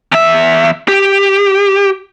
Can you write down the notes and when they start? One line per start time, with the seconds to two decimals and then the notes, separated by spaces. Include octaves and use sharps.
0.12 E2 E5
0.88 G4